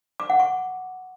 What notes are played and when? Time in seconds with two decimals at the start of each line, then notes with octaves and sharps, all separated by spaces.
0.20 D6
0.30 F#5
0.40 C#6